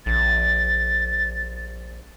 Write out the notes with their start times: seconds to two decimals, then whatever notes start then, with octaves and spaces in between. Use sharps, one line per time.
0.06 A#1 A6